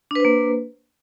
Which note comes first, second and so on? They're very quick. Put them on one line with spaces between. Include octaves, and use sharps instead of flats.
D4 B4 C5 A#3